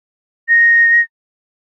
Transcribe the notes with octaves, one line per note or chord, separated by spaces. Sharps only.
A#6